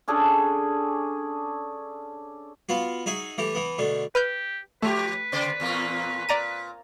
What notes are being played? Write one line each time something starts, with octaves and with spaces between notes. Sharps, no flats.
C#4 D4 G#4 A4
B3 F4 F#4
D#4 F#4 G#4 E5
E3 A3 G4
E3 B3
B2 D3 A3
G4 B4 F6 G6
F3 A3 G4 B4
C#3 C5 D5
E2 A#2 A#3
A#2 D5 A#5 D#7